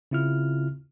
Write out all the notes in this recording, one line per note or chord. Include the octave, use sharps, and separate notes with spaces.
C#3 C4 E4 F4 F6